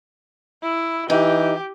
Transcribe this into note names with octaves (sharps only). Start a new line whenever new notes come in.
E4
E3 D#4 G4